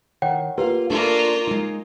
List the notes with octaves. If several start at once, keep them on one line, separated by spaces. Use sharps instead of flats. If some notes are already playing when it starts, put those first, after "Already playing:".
D#3 C#5 F#5 G5
A#3 F4 G4 B4 F5
A3 A#3 D4 F4 D5
G#3 D#4